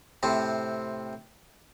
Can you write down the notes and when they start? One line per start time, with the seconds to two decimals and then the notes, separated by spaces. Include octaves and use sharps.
0.23 A2 C3 C4